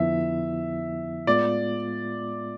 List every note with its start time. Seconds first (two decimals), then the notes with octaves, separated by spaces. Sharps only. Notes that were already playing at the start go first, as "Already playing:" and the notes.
Already playing: F2 D3 F3 B3 E4 E5
1.27 A2 G#3 B3 F4 D5